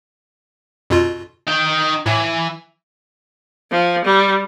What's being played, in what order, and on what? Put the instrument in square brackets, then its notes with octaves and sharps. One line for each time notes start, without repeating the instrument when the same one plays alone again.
[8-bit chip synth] F2 B2 F4
[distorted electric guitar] D#4 G5
[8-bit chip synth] A2 [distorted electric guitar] E3
[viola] F3
G3